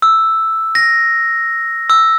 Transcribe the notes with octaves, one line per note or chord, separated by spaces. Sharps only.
E6
A#6
E6